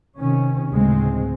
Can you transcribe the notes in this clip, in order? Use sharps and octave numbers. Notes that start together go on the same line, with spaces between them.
C3 D#3 C#4
D2 A2 C#3 G#3 C4